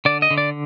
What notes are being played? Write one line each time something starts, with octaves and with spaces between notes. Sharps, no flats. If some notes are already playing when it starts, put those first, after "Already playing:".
D3 D5
D#5
D3
D5